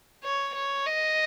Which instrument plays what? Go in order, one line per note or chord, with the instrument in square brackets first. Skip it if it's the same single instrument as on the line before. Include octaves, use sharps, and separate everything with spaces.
[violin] C#5
C#5
D#5